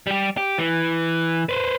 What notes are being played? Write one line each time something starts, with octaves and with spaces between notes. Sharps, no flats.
G3 G4
G4
E3
B4 C5